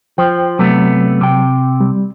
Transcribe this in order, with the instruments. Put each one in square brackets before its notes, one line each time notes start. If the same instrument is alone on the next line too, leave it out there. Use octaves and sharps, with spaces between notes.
[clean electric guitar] F3 [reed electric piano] C5 G5
[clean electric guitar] C3 A3 B3 [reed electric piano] F#3
[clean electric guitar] C3 G5
[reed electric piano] G3